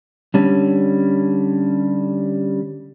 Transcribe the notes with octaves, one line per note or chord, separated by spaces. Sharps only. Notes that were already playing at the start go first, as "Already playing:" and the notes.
D3 G3 C#4